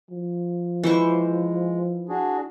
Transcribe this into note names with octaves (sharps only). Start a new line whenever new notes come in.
F3
E3 G#3 C5 C#6
D4 F#4 G#4